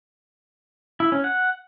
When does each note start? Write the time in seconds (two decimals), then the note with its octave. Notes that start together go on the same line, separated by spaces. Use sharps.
1.00 E4
1.12 C#4
1.24 F#5